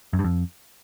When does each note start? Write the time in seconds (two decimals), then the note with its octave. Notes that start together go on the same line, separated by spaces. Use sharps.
0.13 F#2
0.19 G2
0.24 F2